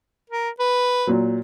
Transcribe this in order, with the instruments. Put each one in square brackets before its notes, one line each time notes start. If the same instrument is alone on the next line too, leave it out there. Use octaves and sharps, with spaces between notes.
[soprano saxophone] A#4
B4
[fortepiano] A#2 F#3